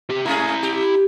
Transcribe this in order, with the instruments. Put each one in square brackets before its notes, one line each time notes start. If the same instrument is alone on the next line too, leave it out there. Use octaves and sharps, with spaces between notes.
[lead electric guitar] C3 G4
[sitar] A3 C#4 G#4 [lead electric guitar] E4 A#5
[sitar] G4